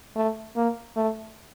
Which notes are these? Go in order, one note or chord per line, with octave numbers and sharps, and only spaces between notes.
A3
A#3
A3